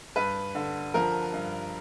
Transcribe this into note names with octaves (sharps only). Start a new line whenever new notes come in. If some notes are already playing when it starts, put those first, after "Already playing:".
G2 B4
D3
F3 A#4
G2